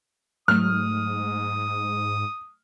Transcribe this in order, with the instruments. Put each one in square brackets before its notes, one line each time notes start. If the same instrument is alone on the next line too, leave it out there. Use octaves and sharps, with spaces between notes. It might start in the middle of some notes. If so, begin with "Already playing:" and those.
[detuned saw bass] G#2 [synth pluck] F#3 A3 [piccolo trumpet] D#6 [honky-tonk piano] F6